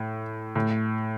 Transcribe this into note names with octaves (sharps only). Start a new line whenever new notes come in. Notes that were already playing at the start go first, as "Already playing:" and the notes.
Already playing: A2
A2